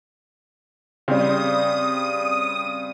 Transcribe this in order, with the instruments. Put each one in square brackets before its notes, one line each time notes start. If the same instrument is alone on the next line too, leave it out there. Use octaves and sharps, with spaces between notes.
[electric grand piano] C#3 [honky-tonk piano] G3 C4 [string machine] D#6